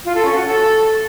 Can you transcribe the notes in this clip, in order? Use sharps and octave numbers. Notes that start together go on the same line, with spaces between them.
F4
A4
C#4
F#4
A4